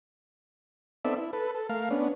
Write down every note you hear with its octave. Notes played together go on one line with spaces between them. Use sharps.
B3 C4 D#4 A4 D5 E5
E4
A4 B4
A4
A3 A#4 F5
B3 C#4 D4